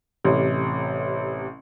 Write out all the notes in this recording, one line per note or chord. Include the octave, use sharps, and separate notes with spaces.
A1 C3